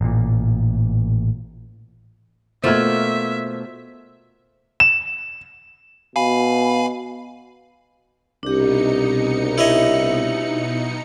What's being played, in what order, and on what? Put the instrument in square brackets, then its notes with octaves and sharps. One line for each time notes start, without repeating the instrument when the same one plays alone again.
[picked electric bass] A1 A#2
[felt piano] B2 F6 G#6 [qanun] A3 A#3 F4 [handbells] C5 [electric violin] E5
[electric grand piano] E7
[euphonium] B2 [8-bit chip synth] F5 G#5 B5
[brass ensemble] C2 [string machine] B2 D#4 C#7 [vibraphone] D4 G4
[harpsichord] E4 C#5 D#5